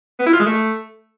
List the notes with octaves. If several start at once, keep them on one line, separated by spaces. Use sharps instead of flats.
B3
E4
F4
G#3
A3